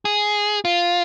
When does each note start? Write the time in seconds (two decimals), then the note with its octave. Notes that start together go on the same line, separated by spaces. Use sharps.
0.05 G#4
0.65 F4